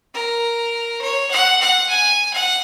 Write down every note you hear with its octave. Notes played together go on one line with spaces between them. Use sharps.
A#4
C#5
F#5
F#5
G#5
F#5